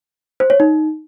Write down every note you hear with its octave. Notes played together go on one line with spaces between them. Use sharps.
C5
C#5
D#4